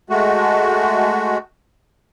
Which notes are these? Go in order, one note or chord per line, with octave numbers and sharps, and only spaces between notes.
G#3 A3 F#4